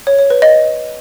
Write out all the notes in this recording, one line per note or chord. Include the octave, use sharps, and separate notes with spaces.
C#5
C#5
B4
D#5